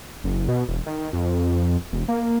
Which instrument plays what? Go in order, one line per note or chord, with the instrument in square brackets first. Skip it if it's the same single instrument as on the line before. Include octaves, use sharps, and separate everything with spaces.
[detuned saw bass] F#1
B2
E1
D#3
F2
E1
A#3